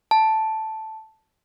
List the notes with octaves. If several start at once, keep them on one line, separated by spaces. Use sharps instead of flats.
A5